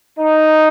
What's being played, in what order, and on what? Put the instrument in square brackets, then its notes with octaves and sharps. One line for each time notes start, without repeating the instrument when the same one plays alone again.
[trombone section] D#4